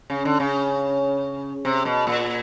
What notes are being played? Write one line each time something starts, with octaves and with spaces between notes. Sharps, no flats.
C#3
D3
C#3
C3
B2
A#2